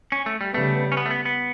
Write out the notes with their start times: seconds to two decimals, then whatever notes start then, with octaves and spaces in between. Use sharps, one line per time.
0.12 C#4
0.26 A3
0.41 G3
0.54 C#3 G3 A3 B3
0.92 C#4
0.97 B3
1.06 A3
1.11 B3
1.25 B3